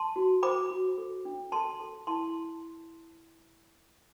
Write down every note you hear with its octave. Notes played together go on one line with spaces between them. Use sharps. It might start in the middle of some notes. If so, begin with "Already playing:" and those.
Already playing: A5 C6
F#4
C5 B5 D6
F#4
A4
D4
A4 A5 C6
A4
E4 A5 C6